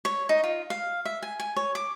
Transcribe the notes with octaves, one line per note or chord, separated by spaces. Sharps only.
C#5
D#4
F4
F5
E5
G#5
G#5
C#5
D6